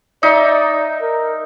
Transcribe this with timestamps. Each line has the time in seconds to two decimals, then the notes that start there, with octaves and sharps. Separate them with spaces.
0.23 D#4 D5 E5
1.02 A#4